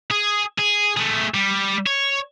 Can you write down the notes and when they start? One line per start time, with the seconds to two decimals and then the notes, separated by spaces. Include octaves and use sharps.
0.11 G#4
0.59 G#4
0.97 A3 G#4
1.34 G3
1.87 C#5